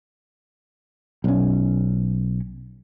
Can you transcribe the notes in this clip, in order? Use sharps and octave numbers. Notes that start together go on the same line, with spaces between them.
B1 C#4